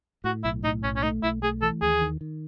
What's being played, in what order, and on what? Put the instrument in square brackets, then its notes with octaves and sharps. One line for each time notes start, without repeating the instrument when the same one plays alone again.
[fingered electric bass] A2 [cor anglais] F#4
[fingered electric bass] B1 [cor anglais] E4
[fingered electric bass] A2 [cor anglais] D#4
[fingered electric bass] B1 [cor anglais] C#4
[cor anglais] C#4
[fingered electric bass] A3 [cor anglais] D#4
[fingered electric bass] B1 [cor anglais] E4
[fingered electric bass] A3 [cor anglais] G#4
[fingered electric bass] E3 [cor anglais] A4
[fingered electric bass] D#2 [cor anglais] G#4
[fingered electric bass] D#3
D#3